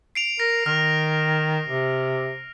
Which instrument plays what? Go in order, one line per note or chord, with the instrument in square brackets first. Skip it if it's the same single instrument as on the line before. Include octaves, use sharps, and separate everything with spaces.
[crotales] C7 D7 F7
[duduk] A#4 [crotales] A#6
[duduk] D#3 [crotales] F6
[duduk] C3